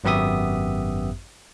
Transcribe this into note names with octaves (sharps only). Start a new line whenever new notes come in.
G#1 F#2 B3 G4 E5 D#6